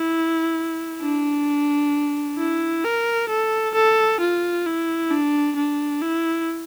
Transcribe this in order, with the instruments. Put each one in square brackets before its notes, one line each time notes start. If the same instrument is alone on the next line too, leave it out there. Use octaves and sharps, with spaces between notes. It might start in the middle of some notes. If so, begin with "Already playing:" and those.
Already playing: [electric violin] E4
D4
E4
A#4
A4
A4
F4
E4
D4
D4
E4